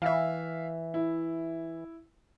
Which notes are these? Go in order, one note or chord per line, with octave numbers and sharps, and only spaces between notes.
E3 E5 F5
E4